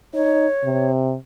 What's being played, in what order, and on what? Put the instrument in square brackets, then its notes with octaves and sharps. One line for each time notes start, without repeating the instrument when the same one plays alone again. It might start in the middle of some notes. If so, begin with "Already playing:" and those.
[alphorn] D#4 [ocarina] C#5
[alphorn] C3